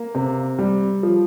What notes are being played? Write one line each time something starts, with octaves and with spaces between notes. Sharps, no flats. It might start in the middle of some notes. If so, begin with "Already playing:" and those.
Already playing: A#3
C3
G3
F3